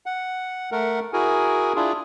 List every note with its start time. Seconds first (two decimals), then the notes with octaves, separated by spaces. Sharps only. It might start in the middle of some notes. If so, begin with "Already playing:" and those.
0.06 F#5
0.72 A3 A#4 F#5
1.13 E4 F#4 G#4 A#4 G#5
1.76 D4 E4 F4 G#4